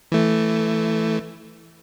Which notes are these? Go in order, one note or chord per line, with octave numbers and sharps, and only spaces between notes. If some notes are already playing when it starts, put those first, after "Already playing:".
E3 A3